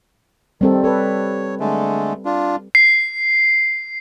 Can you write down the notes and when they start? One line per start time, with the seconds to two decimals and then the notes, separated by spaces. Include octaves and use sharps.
0.61 D#3 G3 C4 A4
0.84 A4 B4 C#5
1.60 D3 G#3 A3
2.25 D4 F4
2.75 C7